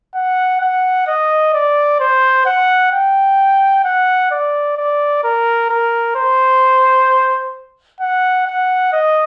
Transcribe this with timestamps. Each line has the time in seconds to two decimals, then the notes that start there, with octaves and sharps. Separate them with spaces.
0.15 F#5
0.61 F#5
1.07 D#5
1.54 D5
2.00 C5
2.46 F#5
2.92 G5
3.84 F#5
4.31 D5
4.77 D5
5.24 A#4
5.69 A#4
6.16 C5
8.00 F#5
8.47 F#5
8.93 D#5